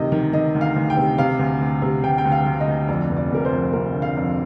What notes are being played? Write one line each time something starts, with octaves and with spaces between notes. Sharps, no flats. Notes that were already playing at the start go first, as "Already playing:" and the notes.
Already playing: D2 C3 D#3 D#5
D#3
D#3 D#5
D2
F5
D2
G5
C3
C3 F5
D2
D2
C3
D2 G5
G5
D2
F5
D2
D#5
D2
F2 D5
F1
D5
F1 A#4
C5
F2
F1 A#4
D3
F5
F2